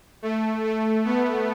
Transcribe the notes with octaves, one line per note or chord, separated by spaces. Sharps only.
A3
A3
B3